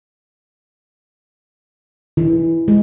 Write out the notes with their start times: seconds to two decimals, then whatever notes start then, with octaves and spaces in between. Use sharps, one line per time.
2.17 E3
2.68 G#3